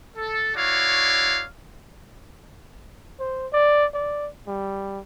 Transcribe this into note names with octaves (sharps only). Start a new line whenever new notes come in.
A4
E4 F#4 C#5 D5 F5
C5
D5
D5
G3